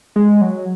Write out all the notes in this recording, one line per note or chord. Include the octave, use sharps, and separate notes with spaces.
G#3
F#3